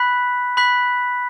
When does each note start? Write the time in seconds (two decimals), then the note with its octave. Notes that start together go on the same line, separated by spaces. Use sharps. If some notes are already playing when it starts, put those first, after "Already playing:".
Already playing: B5 F#6 B6
0.57 B5 F#6 B6